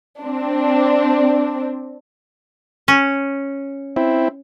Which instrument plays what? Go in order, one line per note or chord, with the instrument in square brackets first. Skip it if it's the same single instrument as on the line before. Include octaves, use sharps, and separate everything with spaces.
[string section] C4 D4
[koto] C#4
[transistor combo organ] C4 E4